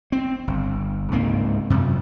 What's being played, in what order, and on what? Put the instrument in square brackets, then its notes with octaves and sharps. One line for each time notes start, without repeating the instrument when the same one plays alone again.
[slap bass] C4
G1
C#2 G#2 A#3 C4
F#2 C3